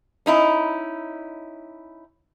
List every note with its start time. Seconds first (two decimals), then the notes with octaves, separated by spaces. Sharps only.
0.26 C#4 D#4 E4